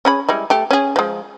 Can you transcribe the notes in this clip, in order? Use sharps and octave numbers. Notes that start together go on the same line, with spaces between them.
C#4 G#4 B5
G3 G#3 E4
A3 G4
C#4 G#4
F3 G#3